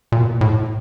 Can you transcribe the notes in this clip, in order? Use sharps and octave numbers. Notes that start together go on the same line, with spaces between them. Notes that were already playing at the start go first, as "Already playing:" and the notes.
A#2
B2
A#2
A2